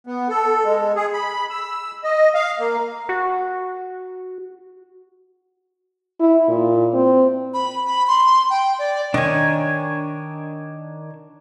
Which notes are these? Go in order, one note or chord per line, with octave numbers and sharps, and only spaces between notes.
B3
A4
G#3
G#4
B5
E6
D#5
F5
A#3
F#4
E4
A#2
C4
B5
B5
C6
G5
D5
D#3 D4 C#5 G#5